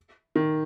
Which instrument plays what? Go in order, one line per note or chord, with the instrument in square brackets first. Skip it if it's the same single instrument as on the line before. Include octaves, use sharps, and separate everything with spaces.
[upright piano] D#3